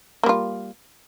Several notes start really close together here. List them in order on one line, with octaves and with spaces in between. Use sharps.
A#3 G3 F4